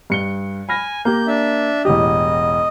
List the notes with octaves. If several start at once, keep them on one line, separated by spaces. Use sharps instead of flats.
G2 C#7 G7
G#5 B5 F6 A#6
A#3 G4 G6
D4 E5
E1 A1 G4 D#5